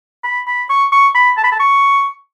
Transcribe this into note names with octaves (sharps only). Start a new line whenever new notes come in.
B5
B5
C#6
C#6
B5
A5
B5
A5
C#6